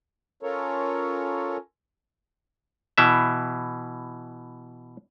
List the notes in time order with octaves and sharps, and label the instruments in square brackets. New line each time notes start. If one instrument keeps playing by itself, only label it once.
[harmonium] C#4 F4 A4 A#4 C#5
[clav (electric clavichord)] B2 E3 E5